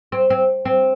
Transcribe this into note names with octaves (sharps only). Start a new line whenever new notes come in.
C4
C4
C4